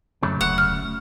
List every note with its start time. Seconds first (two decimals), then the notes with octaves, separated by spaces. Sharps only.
0.23 F2 C#3 F#3 A3
0.41 E1 D2 F#5
0.58 F6
0.83 A3